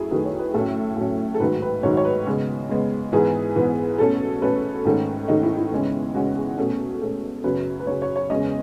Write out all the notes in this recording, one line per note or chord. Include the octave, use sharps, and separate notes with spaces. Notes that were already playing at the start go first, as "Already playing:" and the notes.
Already playing: F#2 A3 E4 G#4
F#2 D#3 A3 B4
C#5
B4
A2 F#3 C#4 A4
A2 F#3 C#4
A4
G#2 D#3 F#3 B4
B4
G#2 D#3 F#3 C#5
C#5
B4
C#3 G#3 B3
C#3 G#3 B3
G#2 E3 B3 G#4
G#2 E3 B3
B2 A3 C#4 A4
B2 A3 C#4 B4
G#2 D#3 A3 C#4
G#2 D#3 A3 C#4 D#4
E4
E4
E2 C#3 G#3 C#4
E2 C#3 G#3 C#4 F#4
G#4
B2 A3 C#4
B2 A3 C#4
F#2 C#3 F#3 C#4 B4
B4
F#2 C#3 F#3 C#4 C#5
C#5
C#5
E2 C#3 G#3 C#4 D#5